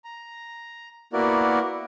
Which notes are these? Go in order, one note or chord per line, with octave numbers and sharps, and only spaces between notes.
A#5
A#3 B3 E4 F#4 A#4 D5